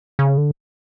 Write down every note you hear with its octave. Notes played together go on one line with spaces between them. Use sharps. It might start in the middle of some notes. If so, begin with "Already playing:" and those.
C#3
D3